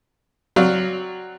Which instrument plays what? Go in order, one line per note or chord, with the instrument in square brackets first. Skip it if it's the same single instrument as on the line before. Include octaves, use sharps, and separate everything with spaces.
[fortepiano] F#3 C4 F#4 D5 F5